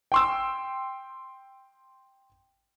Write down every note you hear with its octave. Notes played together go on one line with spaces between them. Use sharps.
G5 C6 E6